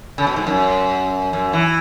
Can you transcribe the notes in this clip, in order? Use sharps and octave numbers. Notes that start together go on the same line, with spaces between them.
C#3
B2
G#2
F#2
F#2
E3